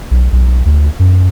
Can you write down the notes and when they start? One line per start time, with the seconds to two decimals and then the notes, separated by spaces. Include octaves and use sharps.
0.11 B1
0.32 B1
0.65 D2
0.99 F#2